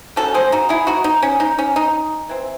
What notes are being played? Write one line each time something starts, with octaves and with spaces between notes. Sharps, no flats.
D#3 G#3 C#4 F#4 A4
G#4 C5
D#4 F#4
E4 G#4
D#4 F#4
D#4
C#4
D#4
C#4
D#4
E3 C4